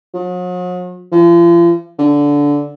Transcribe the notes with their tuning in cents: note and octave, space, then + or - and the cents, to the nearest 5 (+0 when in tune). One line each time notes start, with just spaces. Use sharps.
F#3 -45
F3 -40
D3 -15